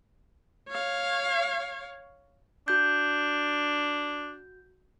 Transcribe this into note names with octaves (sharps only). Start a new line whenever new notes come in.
C#5 F5
D4 F#4 G6